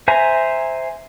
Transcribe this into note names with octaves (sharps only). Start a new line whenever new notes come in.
C5 E5 G#5 A#5